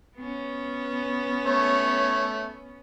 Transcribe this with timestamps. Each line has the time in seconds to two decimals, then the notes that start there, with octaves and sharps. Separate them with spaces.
0.16 B3 C#4
1.46 A3 C#5